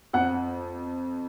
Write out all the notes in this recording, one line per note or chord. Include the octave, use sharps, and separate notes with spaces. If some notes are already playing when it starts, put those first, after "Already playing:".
F2 F#5